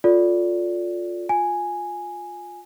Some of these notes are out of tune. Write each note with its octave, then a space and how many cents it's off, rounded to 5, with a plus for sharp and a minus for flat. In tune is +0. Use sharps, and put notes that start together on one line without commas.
F4 +15 A4 +0 D5 -15
F4 +15 G#5 +0